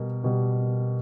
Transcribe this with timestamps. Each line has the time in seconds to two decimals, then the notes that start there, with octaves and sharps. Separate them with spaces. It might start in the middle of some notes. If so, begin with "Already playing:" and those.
Already playing: B2 G3 A#4
0.24 B2 G3